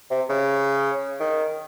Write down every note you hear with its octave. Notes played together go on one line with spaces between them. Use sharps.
C3
C#3
D#3